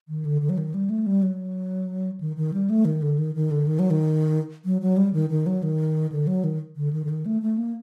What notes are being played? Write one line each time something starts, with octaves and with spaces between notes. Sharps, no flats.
D#3
D3
D3
F#3
D#3
G3
A3
G3
F#3
D#3
D#3
G3
A3
D#3
D3
D#3
D#3
D3
D#3
F#3
D#3
F#3
F#3
G3
D#3
D#3
F#3
D#3
D3
F#3
D#3
D3
D#3
D3
D#3
A3
A3
A#3